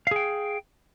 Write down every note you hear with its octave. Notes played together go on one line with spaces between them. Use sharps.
G#4 F5 G5